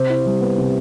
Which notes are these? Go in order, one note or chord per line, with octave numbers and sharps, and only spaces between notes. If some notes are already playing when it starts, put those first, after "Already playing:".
Already playing: C3 C5
E4
G3
B3
C3